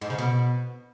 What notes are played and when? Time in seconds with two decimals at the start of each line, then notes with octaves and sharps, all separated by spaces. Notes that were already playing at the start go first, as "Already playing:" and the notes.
0.01 G#2
0.10 C#3
0.18 B2